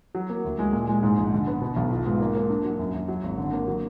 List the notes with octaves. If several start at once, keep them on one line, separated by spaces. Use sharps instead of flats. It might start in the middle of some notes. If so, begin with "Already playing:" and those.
F#3
A#3
D2
G#3
A#2
G#3
G#2
A#1
D3
B3
B2
B1
F4
G#2
A#3
A#3
D4
F#3
F#2
F#2
F#3
G#1
D3
A#3
F#3